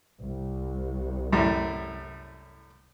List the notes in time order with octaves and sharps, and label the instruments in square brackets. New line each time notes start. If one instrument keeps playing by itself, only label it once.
[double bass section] C2
[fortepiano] F#2 A2 G3